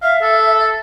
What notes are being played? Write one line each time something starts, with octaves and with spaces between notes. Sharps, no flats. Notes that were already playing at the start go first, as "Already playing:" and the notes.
E5 F5
A4